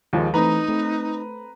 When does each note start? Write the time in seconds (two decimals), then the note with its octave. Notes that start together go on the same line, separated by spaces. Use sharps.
0.13 D#2 F3 G#3
0.34 E3 A3 C4 D#4 B4 A#5
0.68 A3 C4